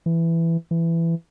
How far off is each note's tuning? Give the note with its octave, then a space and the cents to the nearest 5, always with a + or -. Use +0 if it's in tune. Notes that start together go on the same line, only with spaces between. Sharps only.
E3 +10
E3 +15